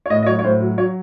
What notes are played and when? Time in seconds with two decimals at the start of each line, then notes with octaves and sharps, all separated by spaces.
0.06 C#5
0.10 A2 D#5
0.23 D#5
0.26 F#3 C#5
0.39 C#5
0.44 A2 C5
0.61 F#3
0.78 F#3 C#5